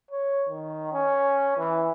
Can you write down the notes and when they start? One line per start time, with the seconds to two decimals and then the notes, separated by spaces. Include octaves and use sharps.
0.11 C#5
0.49 D#3
0.93 C#4
1.57 E3